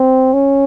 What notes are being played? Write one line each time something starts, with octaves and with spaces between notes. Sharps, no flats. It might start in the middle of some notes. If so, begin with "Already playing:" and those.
Already playing: C4
C#4